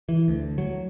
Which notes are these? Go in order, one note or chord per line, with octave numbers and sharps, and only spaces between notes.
E3
D2
F#3